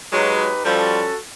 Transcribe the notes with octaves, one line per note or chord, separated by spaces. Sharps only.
F#3 G#3 D#4 G4 B4
F3 G3 C#4 F#4 A4